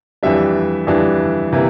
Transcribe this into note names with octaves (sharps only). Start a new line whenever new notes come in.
F2 E3 G3 D4 E5
F2 E3 G3 D4
C3 E3 A#3 E4